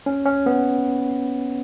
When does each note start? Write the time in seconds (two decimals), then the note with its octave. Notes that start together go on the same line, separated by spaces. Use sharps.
0.06 C#4
0.25 C#4
0.46 B3